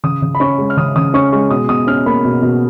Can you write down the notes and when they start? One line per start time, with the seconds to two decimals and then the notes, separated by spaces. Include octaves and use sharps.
0.03 C#3 D#6
0.22 C#3
0.35 B5
0.40 C#4 C#6
0.58 G#3
0.70 F6
0.77 C#3 D#6
0.96 C#3 D#6
1.14 C#4 C#6
1.32 G#3 C#6
1.51 B2 D#6
1.69 B2 D#6
1.87 C#4 F6
2.06 A#3 B5
2.25 B2
2.42 B2